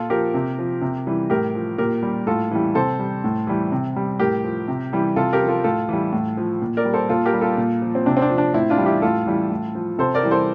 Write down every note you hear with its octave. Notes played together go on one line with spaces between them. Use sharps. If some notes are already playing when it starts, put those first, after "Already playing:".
Already playing: A#2 F4 A4
F3 G4 A#4
C3
F3
C3
E3 G3
A2 G4 A#4
F3
A#2 G4 A#4
G3
A2 F4 A4
E3 G3
C3 A4 C5
G3
A2
E3 G3
C3
G3
A2 G4 A#4
F3
C3
E3 G3
C3 F4 A4
G4 A#4
F3
F4 A4
A2 F4 A4
E3 G3
A2
F3
A#2
A#4 D5
G3
A4 C5
A#2 F4 A4
G4 A#4
G3
F4 A4
A#2
F3
C4
C3 D4
C4
D4
F3
D4
A2 C4 E4
D4 F4
E3 G3
E4 G4
A2 F4 A4
E3 G3
A2
F3
C3 A4 C5
A#4 D5
E3 G3
A4 C5